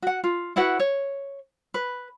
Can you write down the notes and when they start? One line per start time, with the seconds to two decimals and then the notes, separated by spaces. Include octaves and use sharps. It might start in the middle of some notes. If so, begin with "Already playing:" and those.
0.02 F#4 F#5
0.24 F4
0.56 E4 F#4 B4 F#5
0.79 C#5
1.74 B4